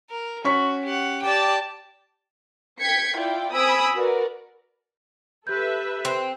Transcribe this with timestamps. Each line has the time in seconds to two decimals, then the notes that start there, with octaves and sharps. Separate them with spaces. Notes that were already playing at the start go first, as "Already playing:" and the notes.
0.10 A#4
0.44 C#4 F#4 C#6 B6
0.85 G4 F#5
1.22 G4 D5 G5 A5
2.80 G5 G#6 B6 C#7
3.18 E4 F4 D5 G5
3.53 C4 G#5 B5 D#6 E6 D7
3.94 F#4 A#4 B4 D5
5.47 G4 A4 B4 E5 G6
6.05 C4